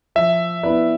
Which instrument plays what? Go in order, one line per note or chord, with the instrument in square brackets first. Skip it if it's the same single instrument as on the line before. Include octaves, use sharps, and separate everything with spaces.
[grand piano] F3 [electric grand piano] E5
[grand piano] B3 E4 B4 D5